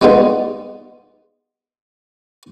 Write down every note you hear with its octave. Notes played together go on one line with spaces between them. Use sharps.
G3 G#3 B3 D#4 F4